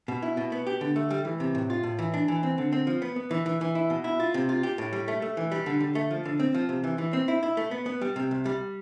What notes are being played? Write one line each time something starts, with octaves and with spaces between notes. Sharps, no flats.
B2
E4
B2
B3
G4
D3
A3
G3
E3
C3
A2
F4
A2
E3
D4
E3
C4
D3
C4
F3
B3
B3
E3
E3
E3
E4
B2
E4
F4
C3
F4
G4
A2
G3
A3
A3
E3
G3
D3
D3
A3
F3
D3
C4
F3
C3
E3
E3
C4
E4
E4
A3
B3
B3
G3
C3
C2
G3